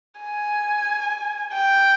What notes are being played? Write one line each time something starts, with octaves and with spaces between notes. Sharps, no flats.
G#5
G5